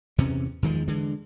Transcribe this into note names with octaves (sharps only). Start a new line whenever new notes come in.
E2 C3 E3 C#4
E2 D#3 F3 G#3
D3 E3 G#3